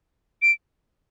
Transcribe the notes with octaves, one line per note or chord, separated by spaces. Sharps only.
D7